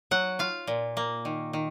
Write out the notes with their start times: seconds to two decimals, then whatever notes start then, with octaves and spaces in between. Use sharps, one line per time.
0.11 F#3 F#5
0.39 F4 F5
0.67 A#2
0.97 A#3
1.25 D#3
1.53 D#3